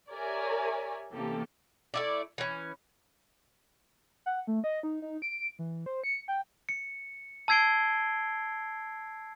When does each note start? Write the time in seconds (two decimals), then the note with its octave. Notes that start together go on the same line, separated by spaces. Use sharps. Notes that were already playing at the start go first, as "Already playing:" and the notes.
0.11 G4 A#4 C#5 D5 E5 G#5
1.13 C3 E3 A#3 C#4 G4 A4
1.94 A3 E4 D5
2.38 E3 C#4
4.26 F#5
4.47 A3
4.64 D#5
4.83 D#4
5.02 D#4
5.22 D7
5.59 E3
5.86 C5
6.04 C#7
6.28 G5
6.69 C#7
7.48 A5 E6 G#6 C7 D7 G7